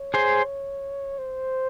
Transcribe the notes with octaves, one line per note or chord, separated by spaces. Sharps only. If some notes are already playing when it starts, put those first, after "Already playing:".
Already playing: C#5
G#4 C5
C5